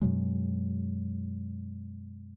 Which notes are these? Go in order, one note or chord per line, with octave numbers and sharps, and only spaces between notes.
F#2 B2 F#3 G#3